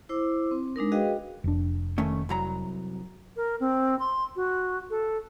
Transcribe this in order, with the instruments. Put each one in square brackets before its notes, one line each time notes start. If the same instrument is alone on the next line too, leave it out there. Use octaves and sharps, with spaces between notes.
[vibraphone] E4 C5 D6 E6
C4
G#3 D4 D#4 A#4
F#4 G#4 B4 D#5 F5 G5
[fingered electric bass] F1 D4
[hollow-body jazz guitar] D#3 A3 C#4
C2 F#3 A#5
[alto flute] A#4
C4
C6
F#4
A4